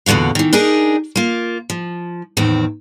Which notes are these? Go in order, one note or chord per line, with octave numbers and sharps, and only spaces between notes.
E2 A#2 D3 F#4 F5
D#3 E3
D4 D#4 G#4 A#4
A#3 F4
F3
E2 A2 D#3 C4